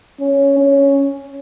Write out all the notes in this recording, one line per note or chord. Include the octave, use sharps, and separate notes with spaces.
C#4
C#4